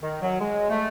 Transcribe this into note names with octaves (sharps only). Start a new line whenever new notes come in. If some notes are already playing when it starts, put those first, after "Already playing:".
D#3
F#3
G#3
A3